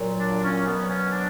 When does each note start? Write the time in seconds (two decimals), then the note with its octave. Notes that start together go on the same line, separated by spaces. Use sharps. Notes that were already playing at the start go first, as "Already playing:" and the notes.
Already playing: A#2 F#3
0.19 D4
0.43 C#4
0.65 B2 F#3 B3
0.89 C#4
1.12 D4